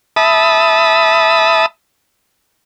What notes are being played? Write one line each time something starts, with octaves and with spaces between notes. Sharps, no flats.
E5 A5 B5 D#6